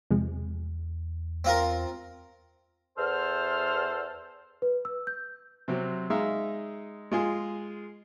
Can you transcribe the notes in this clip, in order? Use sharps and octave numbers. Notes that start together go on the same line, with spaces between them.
E2 C3 F3 G#3
C4 F4 A#4
E2 A4 C5 F6
B4
E6
G6
C3 F#3 C4
G#3 D#4 E5 F5
G#3 F4 G#4